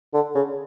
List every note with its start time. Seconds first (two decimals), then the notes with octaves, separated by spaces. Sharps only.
0.14 D3
0.35 C#3